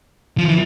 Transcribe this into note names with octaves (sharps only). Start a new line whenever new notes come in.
F3
E3